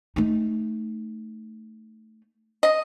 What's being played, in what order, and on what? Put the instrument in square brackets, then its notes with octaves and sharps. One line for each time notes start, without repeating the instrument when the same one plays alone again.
[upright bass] A3 D#4
[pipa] D#5